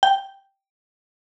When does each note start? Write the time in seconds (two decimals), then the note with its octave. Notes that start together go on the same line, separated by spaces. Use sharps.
0.03 G5